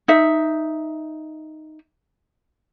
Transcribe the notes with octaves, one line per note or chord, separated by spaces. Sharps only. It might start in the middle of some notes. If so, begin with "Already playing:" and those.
D#4 E5